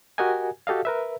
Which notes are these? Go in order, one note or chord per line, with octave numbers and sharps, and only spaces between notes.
F#4 G4 A#4 D#5 F#5 G#5
F#4 G4 A4 D#5 F5
A#4 B4 E5